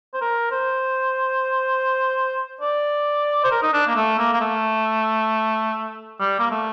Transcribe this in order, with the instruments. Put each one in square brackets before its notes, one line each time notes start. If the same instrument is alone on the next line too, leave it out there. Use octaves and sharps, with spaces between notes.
[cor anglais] C5
A#4
C5
D5
C5
A#4
D#4
D4
A#3
A3
A#3
A#3
A3
G3
A#3
A3